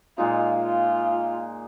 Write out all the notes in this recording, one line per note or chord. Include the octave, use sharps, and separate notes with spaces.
A#2 G#3 D#4 F4
F4